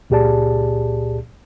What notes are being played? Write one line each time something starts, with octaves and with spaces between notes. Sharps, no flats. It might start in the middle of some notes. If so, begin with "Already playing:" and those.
C#2 A#2 G4 G#4 D5 A5